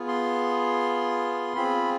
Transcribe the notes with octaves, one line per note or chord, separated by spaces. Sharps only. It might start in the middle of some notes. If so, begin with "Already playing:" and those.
Already playing: B3 F4 G#4
C6
C4 F4 G#4 B5